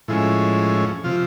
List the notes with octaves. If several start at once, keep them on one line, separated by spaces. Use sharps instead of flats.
A2 F3 G#3 C#4 E4
C3 F3 F4